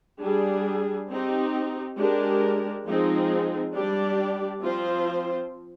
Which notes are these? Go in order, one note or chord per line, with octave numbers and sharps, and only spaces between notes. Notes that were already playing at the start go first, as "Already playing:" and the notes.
G3 D4 G#4
C4 D#4 G4
G#3 D4 G4 A#4
F3 G#3 C4 D#4 G#4
G3 D4 G4 D5
F3 C4 F4 C5